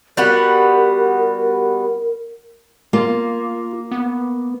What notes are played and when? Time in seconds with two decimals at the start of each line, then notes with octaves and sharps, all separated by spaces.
0.17 G3 B3 F#4 A#4
2.93 A#3 F4
3.91 B3